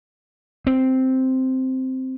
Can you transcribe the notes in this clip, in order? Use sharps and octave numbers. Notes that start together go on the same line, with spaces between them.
C4